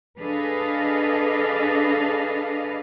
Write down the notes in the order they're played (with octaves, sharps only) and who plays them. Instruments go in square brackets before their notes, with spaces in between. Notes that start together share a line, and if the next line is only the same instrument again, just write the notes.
[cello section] D4 G#4 A4 B4 D#5 F5